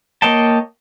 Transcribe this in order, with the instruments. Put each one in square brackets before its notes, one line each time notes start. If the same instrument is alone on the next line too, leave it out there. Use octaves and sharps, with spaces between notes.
[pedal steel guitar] A#3 C#5 D#5 G5 A5